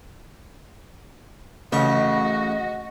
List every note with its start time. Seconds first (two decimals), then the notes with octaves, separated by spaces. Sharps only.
1.72 A1 C#3 C#4 F#4 D#5 C#6